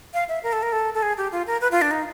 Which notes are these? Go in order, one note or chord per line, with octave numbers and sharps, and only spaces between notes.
F5
E5
A#4
A4
A#4
A4
A4
G#4
G4
F4
A#4
B4
F4
D4
D#4